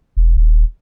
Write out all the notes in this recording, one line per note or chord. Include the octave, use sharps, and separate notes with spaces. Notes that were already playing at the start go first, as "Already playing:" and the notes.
E1
D#1